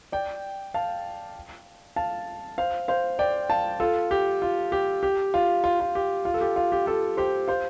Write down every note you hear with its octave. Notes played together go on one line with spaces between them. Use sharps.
D5 G5
F5 A5
F5 A5
C5 F5
C5 F5
D5 G5
F5 A5
F4 A4
G4
F4
G4
G4
F4
F4
F4
G4
F4
A4
G4
F4
G4
F4 A4
G4 C5
C5 F5